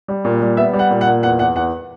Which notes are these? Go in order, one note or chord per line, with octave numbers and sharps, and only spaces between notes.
G3
A#2
G3
B3 E5
G3
F#5
A#2
F#5
A#2
E2 F#5
E2 F#5
E2 F#5